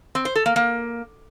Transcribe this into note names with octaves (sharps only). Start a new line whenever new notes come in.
C4
C5
A4
A#3
A#3